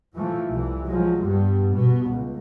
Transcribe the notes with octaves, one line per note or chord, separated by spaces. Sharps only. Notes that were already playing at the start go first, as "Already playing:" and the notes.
A2 E3 F3 A3
C2 E3
F3 F#3 G#3
G2 G3 B3
B2 B3
C#2